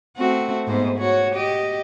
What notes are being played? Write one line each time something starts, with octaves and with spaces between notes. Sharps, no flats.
A3 C4 F#4
G#2 B3 C5
F#4 C#5
G4 D#5